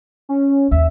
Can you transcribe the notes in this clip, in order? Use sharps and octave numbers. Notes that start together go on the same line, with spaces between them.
C#4
D#2 E5